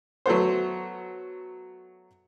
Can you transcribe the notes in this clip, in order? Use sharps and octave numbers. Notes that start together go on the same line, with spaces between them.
F#3 A3 B3 C5